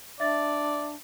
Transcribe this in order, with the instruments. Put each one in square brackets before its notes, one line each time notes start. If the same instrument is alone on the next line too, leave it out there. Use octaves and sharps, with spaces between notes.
[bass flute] D4 [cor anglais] D5 [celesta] E5 A6